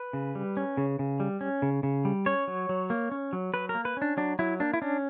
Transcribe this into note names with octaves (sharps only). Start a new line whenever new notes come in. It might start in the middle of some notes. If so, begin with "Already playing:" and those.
Already playing: B4
C#3
G3
C#4
C#3
C#3
G3
C#4
C#3
C#3
G3
C#4 C#5
F#3
F#3
A#3
C#4
F#3
F#3 B4
A#4
A#3
B4
C#4 D4
F#3 D4
F#3 E4
A#3 D4
E4
C#4 D4